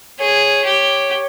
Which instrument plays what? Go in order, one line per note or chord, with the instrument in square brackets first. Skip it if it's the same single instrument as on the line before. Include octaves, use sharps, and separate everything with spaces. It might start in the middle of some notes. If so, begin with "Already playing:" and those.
[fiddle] G#4 [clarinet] C#5
[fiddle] G4